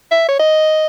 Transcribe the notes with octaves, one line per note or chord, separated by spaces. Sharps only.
E5
C#5
D#5